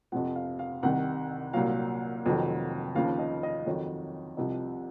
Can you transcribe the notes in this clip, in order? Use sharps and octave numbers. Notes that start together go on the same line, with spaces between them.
F2 C3 F3 F#5
F5
F5
C2 C3 D#3 F#5
C2 A#2 F#3 F5
F1 F2 D#3 F#3
D#2 C#3 F3 F5
D#5
D#5
F2 D#3 F#3 C#5
C2 C3 F3 D#5